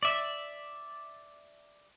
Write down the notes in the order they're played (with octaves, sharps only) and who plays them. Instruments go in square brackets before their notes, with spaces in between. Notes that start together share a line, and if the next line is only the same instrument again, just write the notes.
[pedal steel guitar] D5 E5